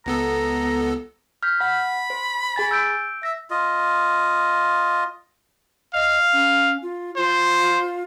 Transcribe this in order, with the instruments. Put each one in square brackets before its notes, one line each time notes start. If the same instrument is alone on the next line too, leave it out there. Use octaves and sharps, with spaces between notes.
[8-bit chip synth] C#2 B3 A4 [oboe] A#5
[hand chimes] F6 G6 B6
[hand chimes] F#5 [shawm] B5
[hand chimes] C5
G#4 G#5 A6
E6 G6 D7
[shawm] E5 [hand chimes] A#6
[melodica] F4 D#5
[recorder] D#5 [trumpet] F5
[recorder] C#4
F4
[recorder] F4 [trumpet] C5